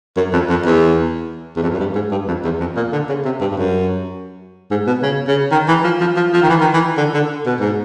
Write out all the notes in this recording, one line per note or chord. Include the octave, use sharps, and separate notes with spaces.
F#2
F2
F2
E2
E2
F2
F#2
G2
G#2
G2
F2
E2
F2
A#2
D3
C#3
C3
G2
G2
F#2
G#2
B2
C#3
C#3
D#3
E3
F3
F3
F3
F3
D#3
E3
D#3
E3
D3
D3
B2
G#2